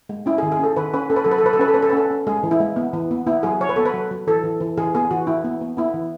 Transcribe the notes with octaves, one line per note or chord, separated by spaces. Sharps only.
G#3
C#4 E4
G#4
D#3
G#4
C#4 A4
D#3 B4
C#4 B4
C#4 A4
B4
F#3 A4
B4
A4
F#3 B4
A4
C#4 B4
A4
C#4 B4
A4
B4
C#4 A4
C#4
G#3 G#4
E3
E4
G#3
B3
E3
B3
B3 E4
F#3 G#4
F#3 C#5
B4
B3 A4
B4
F#3
F#3
E3 A4
E3
E3
E3 G#4
B3 G#4
E3 F#4
E3 E4
B3
B3
B3 E4
E3